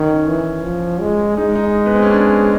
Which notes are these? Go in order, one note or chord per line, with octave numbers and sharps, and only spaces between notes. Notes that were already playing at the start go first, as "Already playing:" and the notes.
Already playing: D#3 C#4
E3
F3
G#3
G#3 D#4
D#4
B3
C4
C#4
D4